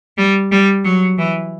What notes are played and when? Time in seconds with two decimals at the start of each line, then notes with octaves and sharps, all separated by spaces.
0.18 G3
0.52 G3
0.84 F#3
1.18 E3